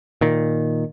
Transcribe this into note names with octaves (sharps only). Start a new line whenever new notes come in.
A#2 D#3